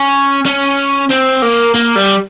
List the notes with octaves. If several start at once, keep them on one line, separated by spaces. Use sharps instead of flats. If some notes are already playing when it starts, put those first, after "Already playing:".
Already playing: C#4
C#4
C4
A#3
A#3
G3